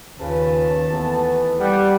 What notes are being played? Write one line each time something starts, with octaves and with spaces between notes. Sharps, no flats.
D#2 C#3 F4 B4 A5
E3 A3 B3
G3 F#5